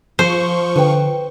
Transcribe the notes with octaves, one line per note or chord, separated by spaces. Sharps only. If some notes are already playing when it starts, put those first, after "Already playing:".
F3 C5 C#6
D3 B4 G5